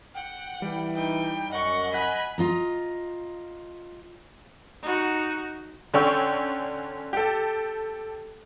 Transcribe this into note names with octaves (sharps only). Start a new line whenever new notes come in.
F#5 G5
E3 G3
D#4 G5
F#2 D#5 F#5 C#6
F#5 G#5 B5 F#6 B6
F4 D#5 A#5
D#4 F#4
D3 C#4 D4 G5 C#6 E6
G4 A4